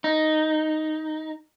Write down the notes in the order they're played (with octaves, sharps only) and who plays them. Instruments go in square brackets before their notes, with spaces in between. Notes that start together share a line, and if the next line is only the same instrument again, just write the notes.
[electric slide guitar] D#4